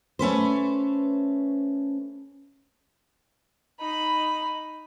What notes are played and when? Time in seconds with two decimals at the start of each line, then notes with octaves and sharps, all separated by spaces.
0.19 A3 C#4 B4 C5
3.80 D#4 B5